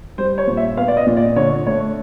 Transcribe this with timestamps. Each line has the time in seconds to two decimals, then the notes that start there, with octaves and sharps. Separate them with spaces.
0.18 G3 C5
0.38 C#5
0.47 A#2
0.57 E5
0.77 B3 F5
0.88 D5
0.97 D#5
1.07 A#2
1.17 D5
1.36 D3 C#5
1.66 A3 C#5